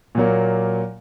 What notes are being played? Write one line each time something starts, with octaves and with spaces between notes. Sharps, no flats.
A#2 F#3 A#3